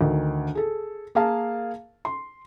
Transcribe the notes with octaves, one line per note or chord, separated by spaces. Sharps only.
D2 D#3
G#4 A4
A#3 G#4 A#4 F5 A5
C6